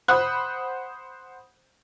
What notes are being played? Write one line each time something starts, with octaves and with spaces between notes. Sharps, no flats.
C5 F#5 B5 D#6 F#6